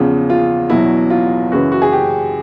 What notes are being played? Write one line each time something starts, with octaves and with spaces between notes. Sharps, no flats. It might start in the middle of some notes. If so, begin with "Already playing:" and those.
Already playing: E2 C#3 F3
F4
E2 B2 F#3 E4
F4
F#2 C#3 E3 F#4
F#4
G#4
G4